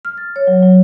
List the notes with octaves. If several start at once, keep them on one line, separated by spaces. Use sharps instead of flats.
F6
A6
C#5
F#3
F#3